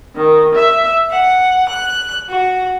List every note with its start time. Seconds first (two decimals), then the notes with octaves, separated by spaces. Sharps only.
0.16 D#3
0.55 E5
1.10 F#5
1.68 F#6
2.29 F#4